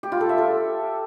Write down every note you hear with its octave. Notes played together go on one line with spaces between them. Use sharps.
G4
F4
A4
E5
A4